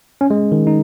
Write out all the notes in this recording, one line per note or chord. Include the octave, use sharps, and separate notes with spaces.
C#4
G#3
D#3
D#4